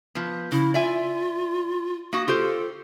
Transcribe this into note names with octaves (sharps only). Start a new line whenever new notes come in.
F3 B3
C#3 E4
F4 D5 E5 G#5
A#3 F#4 D#6
F4 G4 A4 C5